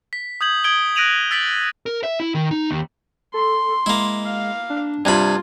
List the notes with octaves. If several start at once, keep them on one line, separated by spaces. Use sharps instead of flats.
B6
D#6 G6 G#6 F#7
D#6 G#6 D7 G7
F#6 A#6 D7 D#7 F7 F#7
E6 A6 B6 D7 F#7
A#4
E5
E4
D#3
D#4
D#2
A4 C6
G#3 A#3 E4
F5
D4
G2 C3 F4 B5 G#6